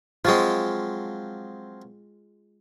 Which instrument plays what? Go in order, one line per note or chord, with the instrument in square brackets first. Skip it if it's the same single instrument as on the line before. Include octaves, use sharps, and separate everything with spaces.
[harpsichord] F3 F#3 C4 [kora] G#3 F4